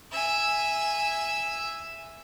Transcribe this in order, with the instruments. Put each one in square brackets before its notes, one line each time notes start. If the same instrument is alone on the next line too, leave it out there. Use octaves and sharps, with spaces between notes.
[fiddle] E5 G#5